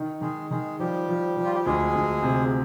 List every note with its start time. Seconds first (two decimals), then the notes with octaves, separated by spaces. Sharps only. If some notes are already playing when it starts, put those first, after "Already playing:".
Already playing: D#3
0.21 D#3 G#3 G#4
0.50 D#3 G#3 G#4
0.79 F3 G3 G4
1.08 F3
1.37 F3
1.45 F4
1.55 G4
1.66 D2 G#3 G#4
1.95 D2
2.23 C3